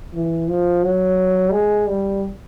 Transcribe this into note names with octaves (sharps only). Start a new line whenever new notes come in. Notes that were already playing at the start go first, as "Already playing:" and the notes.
E3
F3
F#3
G#3
G3